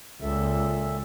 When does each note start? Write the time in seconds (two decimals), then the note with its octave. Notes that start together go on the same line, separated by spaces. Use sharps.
0.22 C#2 A#2 A4 E5